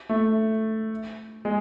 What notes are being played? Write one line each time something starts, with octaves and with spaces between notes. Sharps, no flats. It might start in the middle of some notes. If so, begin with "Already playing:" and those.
A3
G#3